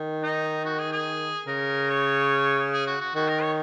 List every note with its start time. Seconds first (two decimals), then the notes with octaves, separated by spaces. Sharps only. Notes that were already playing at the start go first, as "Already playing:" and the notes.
Already playing: D#3
0.23 D#4
0.65 F#4
0.79 G#4
0.92 G#4
1.47 C#3 A#4
1.90 C#5
2.73 G#4
2.87 F#4
3.01 F#4
3.15 D#3 F#4
3.28 A#4
3.42 C#5